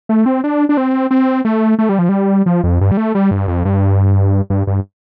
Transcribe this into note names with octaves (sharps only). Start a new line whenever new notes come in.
A3
C4
D4
D4
C4
C4
A3
A3
G3
F3
G3
F3
F2
G2
G3
A3
G3
G2
F2
G2
G2
G2